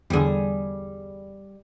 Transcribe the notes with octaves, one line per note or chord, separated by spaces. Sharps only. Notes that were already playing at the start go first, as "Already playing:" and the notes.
E2 D3 G3 G#4